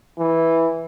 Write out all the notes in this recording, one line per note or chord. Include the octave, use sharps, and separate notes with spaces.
E3